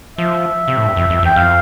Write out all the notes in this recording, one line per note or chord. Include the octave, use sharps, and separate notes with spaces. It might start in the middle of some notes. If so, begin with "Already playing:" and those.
F3 E5
C3
A2
G2
F2
F2
E2 G5
F2 F5